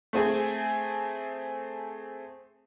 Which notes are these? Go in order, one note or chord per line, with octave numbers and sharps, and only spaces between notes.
A3 C4 G#4 G#5